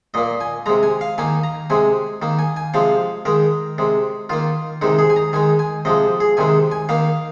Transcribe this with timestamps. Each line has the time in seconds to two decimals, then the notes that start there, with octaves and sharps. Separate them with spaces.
0.14 A#2 A#3 D#5
0.41 G#5
0.66 C3 G#3 A#5
0.83 G#5
1.01 F5
1.18 D#3 A#3 G#5
1.43 A#5
1.70 C3 G#3 G#5
2.22 D#3 A#3
2.39 G#5
2.57 G#5
2.74 C3 F3 G#3 F5
3.25 D#3 G#3 A#4
3.78 C3 G#3
4.29 D#3 A#3 F4
4.82 C3 D#3 G#3 D#4
4.99 G#4
5.10 G#5
5.16 A#5
5.33 D#3 G#3 G#5
5.59 G#5
5.85 C3 F3 G#3 D#5
6.20 G#4
6.37 C3 D#3 G#3 G#5
6.72 G#5
6.89 D#3 A#3 F5